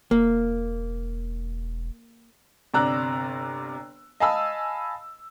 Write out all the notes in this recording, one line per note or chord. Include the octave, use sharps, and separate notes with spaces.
E1 A#3
G1 C3 D5 A#5 E6 F#6
D#5 F5 G#5 A5 B5 E6